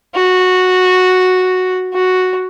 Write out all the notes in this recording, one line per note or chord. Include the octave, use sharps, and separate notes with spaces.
F#4
F#4